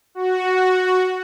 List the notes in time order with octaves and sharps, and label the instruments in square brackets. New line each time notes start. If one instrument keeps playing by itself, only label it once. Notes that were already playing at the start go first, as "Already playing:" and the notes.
[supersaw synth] F#4